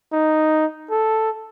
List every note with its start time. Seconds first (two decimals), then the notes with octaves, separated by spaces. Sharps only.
0.13 D#4
0.90 A4